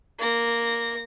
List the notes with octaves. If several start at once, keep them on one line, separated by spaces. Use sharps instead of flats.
A#3 A#6